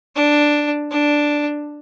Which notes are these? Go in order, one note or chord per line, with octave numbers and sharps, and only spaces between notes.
D4
D4